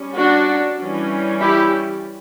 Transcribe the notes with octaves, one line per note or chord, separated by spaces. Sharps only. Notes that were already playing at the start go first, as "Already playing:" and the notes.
Already playing: G3 C#4
D4 F#4
E3 G3 C#4
E4 G4